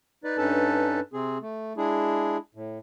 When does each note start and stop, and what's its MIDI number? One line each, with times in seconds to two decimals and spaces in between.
0.24 0.38 63
0.24 0.38 71
0.24 0.38 74
0.38 1.00 43
0.38 1.00 61
0.38 1.00 63
0.38 1.00 69
0.38 1.00 71
0.38 1.00 81
1.13 1.38 48
1.13 1.38 60
1.13 1.38 68
1.41 1.73 57
1.77 2.37 56
1.77 2.37 62
1.77 2.37 64
1.77 2.37 68
2.55 2.78 45